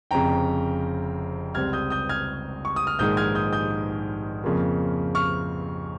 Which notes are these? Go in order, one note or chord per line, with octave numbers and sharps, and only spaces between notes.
F1 F2 C#3 G5 A#5
C#2 C3 G3 C4 F6 G#6
D#6 G6
D#6 G6
F6 G#6
C#6
D#6
F6
A#1 G#2 D#3 G#3 D#6 G6
F6 G#6
D#6 G6
D#6 G6
F2 C#3 F3 A#3
C#6 F6